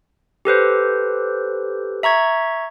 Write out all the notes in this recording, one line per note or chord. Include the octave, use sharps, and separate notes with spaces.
G4 A4 B4 C5
E5 A#5 C#6 G#6